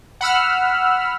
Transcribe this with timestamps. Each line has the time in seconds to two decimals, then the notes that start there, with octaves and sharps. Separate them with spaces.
0.21 F#5 B5 E6 F6